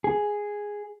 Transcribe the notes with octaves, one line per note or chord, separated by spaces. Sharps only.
G#4